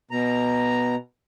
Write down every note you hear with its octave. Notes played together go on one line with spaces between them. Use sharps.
B2 A#5